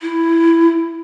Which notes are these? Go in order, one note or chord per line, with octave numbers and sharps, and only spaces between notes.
E4